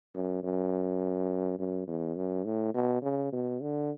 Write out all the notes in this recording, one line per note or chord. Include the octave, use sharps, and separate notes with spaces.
F#2
F#2
F#2
E2
F#2
A2
B2
C#3
B2
D3